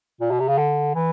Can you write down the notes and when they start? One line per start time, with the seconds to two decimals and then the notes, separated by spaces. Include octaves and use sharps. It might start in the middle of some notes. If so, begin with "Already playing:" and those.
0.21 A#2
0.31 B2
0.39 C3
0.48 C#3
0.58 D3
0.95 E3